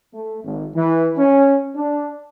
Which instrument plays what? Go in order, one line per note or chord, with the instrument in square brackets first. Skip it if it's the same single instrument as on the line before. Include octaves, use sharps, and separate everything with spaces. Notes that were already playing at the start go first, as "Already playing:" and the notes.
[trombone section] A3
G#1
E3
C#4
D4